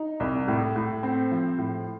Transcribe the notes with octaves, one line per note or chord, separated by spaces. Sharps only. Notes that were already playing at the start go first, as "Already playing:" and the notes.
Already playing: D#4
C2
A2
A2
C4
F3
A2